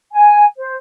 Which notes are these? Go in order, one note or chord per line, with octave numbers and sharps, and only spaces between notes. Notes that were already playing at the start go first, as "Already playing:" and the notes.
G#5
C5